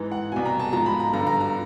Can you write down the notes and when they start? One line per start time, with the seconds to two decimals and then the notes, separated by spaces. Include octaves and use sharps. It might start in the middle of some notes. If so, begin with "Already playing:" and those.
Already playing: G#2 E3
0.11 F#5
0.32 C2 B2 G#5
0.45 A#5
0.59 A5
0.73 G#2 F3 A#5
0.86 B5
1.00 A#5
1.13 G2 D3 F3 A#5
1.27 A#5
1.41 A#5